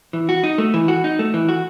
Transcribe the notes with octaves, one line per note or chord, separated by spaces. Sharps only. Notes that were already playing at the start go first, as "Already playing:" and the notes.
E3
F#4
D#4
A3
E3
F#4
D#4
A3
E3
F#4